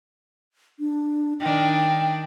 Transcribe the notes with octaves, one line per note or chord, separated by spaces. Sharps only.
D4
D#3 D4 G5